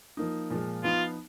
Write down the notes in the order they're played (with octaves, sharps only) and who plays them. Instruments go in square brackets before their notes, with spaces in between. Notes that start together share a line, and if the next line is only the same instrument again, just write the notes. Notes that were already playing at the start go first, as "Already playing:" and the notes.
[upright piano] F3 A#3 D#4
A#2 F3 G#3
[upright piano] F3 B3 D#4 [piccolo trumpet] F4